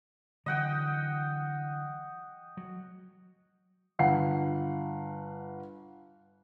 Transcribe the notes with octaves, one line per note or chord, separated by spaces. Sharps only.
D3 E3 F#3 D#5 F#5 G5
F#3
G1 F5 F#5 C7